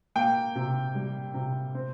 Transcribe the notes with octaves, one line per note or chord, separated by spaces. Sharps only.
A#3 G5
C3
G3
C3
C4